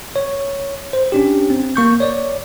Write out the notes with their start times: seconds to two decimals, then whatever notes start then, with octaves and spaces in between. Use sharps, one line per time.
0.16 C#5
0.93 C5
1.12 C#4 D4 G4
1.50 C4
1.76 A#3 C#6 G6
2.00 C#5 D5